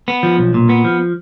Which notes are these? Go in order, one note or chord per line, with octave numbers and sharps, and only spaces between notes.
B3
F3
B1
A#2
B3
F3